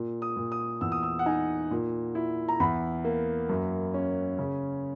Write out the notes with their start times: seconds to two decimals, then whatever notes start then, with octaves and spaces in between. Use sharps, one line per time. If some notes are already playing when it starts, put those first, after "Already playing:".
Already playing: A#2
0.22 D#6
0.37 A#2
0.52 D#6
0.81 E2 E6
0.92 D#6
1.03 E6
1.19 F#5
1.26 D#4 G#5
1.71 A#2
2.15 E4
2.49 A#5
2.60 E2 B5
3.05 A#3
3.49 F#2
3.94 C#4
4.38 C#3